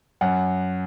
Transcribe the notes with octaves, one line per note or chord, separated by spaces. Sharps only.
F#2 F#5